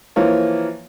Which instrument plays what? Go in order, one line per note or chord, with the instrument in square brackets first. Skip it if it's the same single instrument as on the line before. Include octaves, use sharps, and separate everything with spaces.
[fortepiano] E3 F3 A#3 F4 C#5